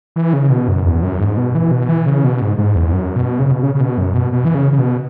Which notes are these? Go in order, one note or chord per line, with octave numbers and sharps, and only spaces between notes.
E3
C#3
B2
F#2
E2
F#2
G#2
B2
E3
B2
E3
C#3
B2
G#2
G#2
E2
F#2
B2
C#3
B2
C#3
C#3
B2
F#2
B2
B2
E3
C#3
C#3
B2